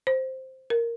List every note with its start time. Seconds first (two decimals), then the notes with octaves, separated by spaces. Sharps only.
0.07 C5
0.70 A#4